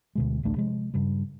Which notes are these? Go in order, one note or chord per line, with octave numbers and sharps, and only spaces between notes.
D2 B2 G#3
A1 D2 A3 D4
C3 F3 G#3
G2 C#3 G3